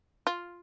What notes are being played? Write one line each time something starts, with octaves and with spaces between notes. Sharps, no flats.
F4